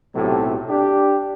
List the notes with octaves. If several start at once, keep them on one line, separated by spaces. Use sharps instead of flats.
B1 A2 C3 F#3 G4 A4
D4 G4